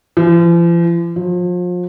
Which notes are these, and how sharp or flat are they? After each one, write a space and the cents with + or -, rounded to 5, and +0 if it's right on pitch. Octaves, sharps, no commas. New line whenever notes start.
F3 -45
F3 +35